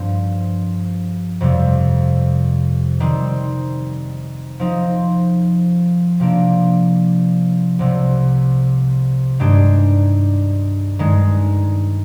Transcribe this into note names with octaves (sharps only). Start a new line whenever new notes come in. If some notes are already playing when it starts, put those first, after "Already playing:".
Already playing: G2 F3 C4
F2 C3 G3
D#3 G3 C4
F3 C4 D#4
C3 F3 A#3 D4
C2 C3 G3
G2 D#3 G#3 D4 G4
G2 D#3 G#3